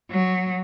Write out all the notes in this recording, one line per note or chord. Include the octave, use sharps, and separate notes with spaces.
F#3